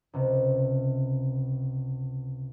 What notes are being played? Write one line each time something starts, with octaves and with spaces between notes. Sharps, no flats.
C#2 C3